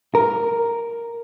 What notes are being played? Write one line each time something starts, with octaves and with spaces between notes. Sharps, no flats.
A#4